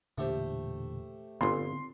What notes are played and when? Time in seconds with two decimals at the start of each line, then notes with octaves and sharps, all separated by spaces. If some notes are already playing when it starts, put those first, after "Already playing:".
0.18 E1 A#2 D3 A3 G4 C5
1.41 G1 A#2 D3 B3 C4 C6